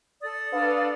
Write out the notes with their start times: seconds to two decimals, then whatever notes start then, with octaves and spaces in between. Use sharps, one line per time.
0.22 A4 D5 D#6
0.53 D4 B4 F5